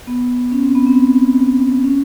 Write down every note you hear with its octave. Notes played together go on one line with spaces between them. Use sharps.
B3
C#4
C4
B3
C4
C#4